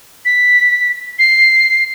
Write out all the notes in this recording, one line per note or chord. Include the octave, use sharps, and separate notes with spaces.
B6
C7